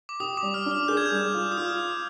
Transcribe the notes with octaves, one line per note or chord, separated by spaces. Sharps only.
D6
G4 D#6
D6
G3
F6
D4
F6
G#4 G6
G#6
G6
G3
F4
D#6
F4 F6